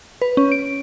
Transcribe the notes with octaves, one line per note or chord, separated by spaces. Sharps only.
B4
C#4
D7